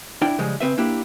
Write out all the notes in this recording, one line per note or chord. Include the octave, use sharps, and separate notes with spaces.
D4 E4 G5
C#3 F3 G3 G#3
C#3 C4 B4 E5
A#3 D4 E4 G4